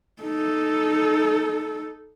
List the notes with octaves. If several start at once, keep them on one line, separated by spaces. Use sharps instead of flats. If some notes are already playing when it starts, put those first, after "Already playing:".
D#4 A4